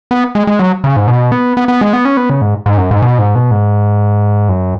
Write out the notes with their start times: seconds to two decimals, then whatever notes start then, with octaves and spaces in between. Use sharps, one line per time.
0.11 B3
0.35 G#3
0.47 G#3
0.59 F#3
0.84 C#3
0.96 G#2
1.07 B2
1.32 B3
1.57 B3
1.68 B3
1.81 G#3
1.93 B3
2.05 C#4
2.17 B3
2.30 C#3
2.42 G#2
2.66 G#2
2.78 F#2
2.91 G#2
3.02 B2
3.19 G#2
3.35 B2
3.51 G#2
4.49 F#2